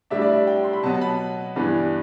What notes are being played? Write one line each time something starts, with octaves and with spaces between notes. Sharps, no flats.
A2 G3 D4 E5
D5
E5
G5
C6
B5
B2 F#3 B3 A5
A5
B5
G2 E3 B3 D4